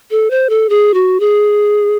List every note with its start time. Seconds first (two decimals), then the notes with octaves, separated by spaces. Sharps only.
0.11 A4
0.31 C5
0.50 A4
0.69 G#4
0.94 F#4
1.20 G#4